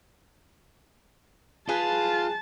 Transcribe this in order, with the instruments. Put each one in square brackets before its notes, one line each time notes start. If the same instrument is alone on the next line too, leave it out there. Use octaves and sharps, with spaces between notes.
[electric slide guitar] F4 [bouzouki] G#4 B4 [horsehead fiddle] A5